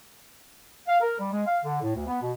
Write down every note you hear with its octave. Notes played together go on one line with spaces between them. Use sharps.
F5
A#4
G3
G#3
F5
D3
A2
D2
B3
B2